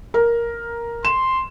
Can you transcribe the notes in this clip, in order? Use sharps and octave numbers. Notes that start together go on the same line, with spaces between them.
A#4
C6 E7